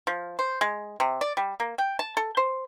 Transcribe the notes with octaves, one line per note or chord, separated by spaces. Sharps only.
F3
C5
G#3
C3
D5
G3
A#3
G5
A5
A4
C5